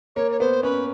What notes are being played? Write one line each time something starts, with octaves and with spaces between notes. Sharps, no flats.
A#3 C#5
C#5
B3 C5
C#4 B4